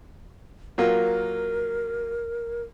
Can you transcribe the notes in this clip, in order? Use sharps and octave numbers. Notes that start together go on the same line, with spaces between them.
F#3 A#3 F4 A#4